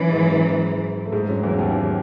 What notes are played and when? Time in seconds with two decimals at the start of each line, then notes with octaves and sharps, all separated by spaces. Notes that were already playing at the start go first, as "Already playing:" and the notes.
Already playing: F#2 E3 F#3
0.11 G#2 G#3
0.31 G#2 G#3
1.05 A3
1.12 G#2 G#3
1.28 F#2 F#3
1.43 E2 E3
1.58 D#2 D#3